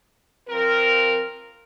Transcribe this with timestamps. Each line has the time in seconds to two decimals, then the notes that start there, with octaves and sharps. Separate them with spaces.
0.49 F3 C4 A#4